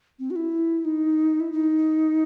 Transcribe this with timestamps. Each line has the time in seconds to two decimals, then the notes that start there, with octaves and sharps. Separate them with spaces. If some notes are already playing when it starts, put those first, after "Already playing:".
0.19 C4
0.30 F#4
0.36 E4
0.85 D#4
1.40 E4
1.52 D#4